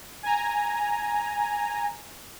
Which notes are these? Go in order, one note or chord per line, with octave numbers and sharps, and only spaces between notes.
G#5 A#5